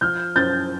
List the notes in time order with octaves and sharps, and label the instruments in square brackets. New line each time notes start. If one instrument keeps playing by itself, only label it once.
[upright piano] F3 F6 G6
F#2 G6 A6